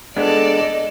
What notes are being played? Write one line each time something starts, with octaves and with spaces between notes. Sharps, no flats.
G#3 B3 D4 A4 D5 D#5 A5